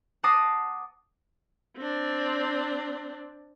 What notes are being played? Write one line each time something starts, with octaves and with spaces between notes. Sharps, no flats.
F#5 A5 D6 D#6 A#6 C7
C4 D4